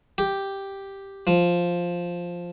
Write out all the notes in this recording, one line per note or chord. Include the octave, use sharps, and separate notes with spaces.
G4
F3